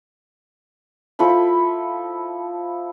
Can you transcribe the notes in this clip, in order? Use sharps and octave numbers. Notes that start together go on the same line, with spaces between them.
F3 E4 A4 B5